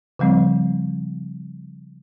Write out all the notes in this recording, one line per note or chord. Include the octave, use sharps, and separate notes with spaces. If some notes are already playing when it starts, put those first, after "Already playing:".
C#3 F3 G3 C4